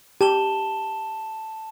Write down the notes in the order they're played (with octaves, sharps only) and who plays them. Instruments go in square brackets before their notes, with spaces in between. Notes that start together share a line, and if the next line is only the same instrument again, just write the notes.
[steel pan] G4 [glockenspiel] A5 E7 G7